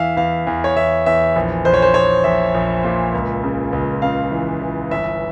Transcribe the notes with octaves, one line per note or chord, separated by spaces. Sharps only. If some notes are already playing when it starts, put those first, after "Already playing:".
Already playing: E2 E3 E5 F5
E2 F5
E2
C#5
E2 E5
E2 E5
A#1
A#1 C5
C#5
C5
A#1 C#5
A#1 E5
A#1
A#2
C#2
C#3
C#2
C#3 F5
E3
E3
G1 E5